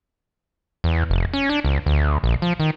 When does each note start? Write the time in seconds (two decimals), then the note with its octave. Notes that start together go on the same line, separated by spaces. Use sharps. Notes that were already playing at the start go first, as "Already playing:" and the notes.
0.84 E2
1.10 F1
1.34 C#4
1.50 D4
1.64 C#2
1.86 D2
2.24 A#1
2.42 F3
2.60 D#3